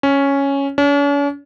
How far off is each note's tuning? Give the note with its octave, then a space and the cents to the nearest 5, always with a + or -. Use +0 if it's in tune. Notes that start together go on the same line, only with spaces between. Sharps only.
C#4 +0
C#4 +45